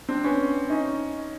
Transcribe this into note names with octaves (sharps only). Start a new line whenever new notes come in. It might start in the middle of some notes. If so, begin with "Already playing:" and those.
C4 D4
B3 C#4
C#4 D#4